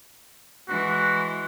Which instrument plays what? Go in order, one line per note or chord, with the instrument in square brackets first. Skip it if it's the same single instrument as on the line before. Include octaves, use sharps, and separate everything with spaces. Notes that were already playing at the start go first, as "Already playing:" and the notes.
[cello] E3 G#3 [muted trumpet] F#4